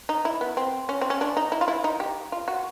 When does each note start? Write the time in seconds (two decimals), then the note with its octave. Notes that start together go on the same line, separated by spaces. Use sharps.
0.09 D#4
0.25 E4
0.41 B3
0.57 C4
0.89 C#4
1.01 C4
1.10 C#4
1.21 D4
1.37 D#4
1.52 E4
1.61 F4
1.68 E4
1.84 D#4
2.00 G4
2.32 F4
2.48 F#4